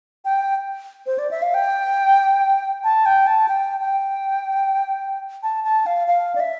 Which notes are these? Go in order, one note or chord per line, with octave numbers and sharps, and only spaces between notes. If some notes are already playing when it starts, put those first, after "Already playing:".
G5
C5
D5
E5
F5
G5
A5
G5
A5
G5
G5
A5
A5
F5
F5
D5
E5